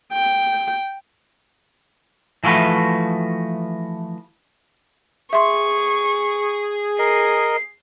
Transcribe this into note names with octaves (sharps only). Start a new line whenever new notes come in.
G5
E3 F3 A3 F#4 B4
G#4 E5 C6 C#6
A#4 D#5 C7